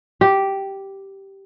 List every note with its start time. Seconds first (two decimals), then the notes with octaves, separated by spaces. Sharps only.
0.21 G4